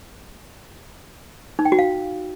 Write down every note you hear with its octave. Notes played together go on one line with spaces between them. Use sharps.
D#4
G5
F#4
F5